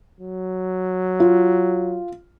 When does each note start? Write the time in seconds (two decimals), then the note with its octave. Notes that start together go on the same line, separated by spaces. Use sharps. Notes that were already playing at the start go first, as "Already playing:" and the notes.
0.20 F#3
1.20 F4